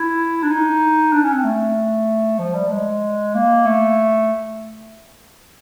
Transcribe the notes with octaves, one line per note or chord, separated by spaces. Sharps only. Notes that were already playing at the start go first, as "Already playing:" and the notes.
Already playing: E4
D4
D#4
D4
C#4
C4
A3
F3
G3
G#3
A#3
A3